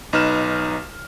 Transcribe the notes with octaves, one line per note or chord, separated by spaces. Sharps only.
B1 D#4 B4 F6 E7